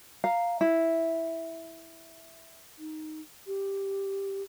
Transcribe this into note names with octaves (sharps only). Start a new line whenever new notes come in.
F5 A#5
E4
D#4
G4